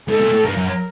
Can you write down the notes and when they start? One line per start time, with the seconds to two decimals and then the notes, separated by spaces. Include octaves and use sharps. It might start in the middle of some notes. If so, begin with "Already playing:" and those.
0.08 G#2 A4
0.20 A#2
0.33 A2
0.44 G2 A#4
0.57 F#2